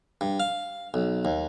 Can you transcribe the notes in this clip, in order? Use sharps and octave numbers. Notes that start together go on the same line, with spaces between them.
G2
F5
B1
D#2